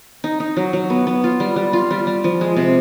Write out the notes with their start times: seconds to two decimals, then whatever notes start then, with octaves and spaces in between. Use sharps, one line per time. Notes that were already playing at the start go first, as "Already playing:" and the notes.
0.24 D#4
0.40 D#4
0.57 F#3
0.73 F#3
0.90 B3
1.07 B3
1.24 F4
1.40 G3
1.56 G3
1.73 F4
1.91 G3
2.07 G3
2.24 F3
2.41 G#3
2.56 C3